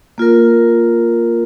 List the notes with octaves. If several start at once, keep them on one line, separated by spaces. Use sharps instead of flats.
A#3 F4 A#4